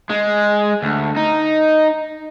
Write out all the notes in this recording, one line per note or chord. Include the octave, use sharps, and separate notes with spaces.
G#3
D2
D#4